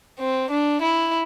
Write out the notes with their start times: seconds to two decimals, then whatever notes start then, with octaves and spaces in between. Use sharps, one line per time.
0.19 C4
0.51 D4
0.82 E4